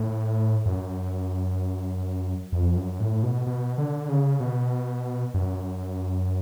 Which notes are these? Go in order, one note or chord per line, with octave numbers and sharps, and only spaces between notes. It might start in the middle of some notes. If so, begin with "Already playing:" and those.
Already playing: A2
F#2
F2
F#2
A2
B2
B2
D3
C#3
B2
F#2